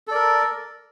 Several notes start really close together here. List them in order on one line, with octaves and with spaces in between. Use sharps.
A4 D5 A#4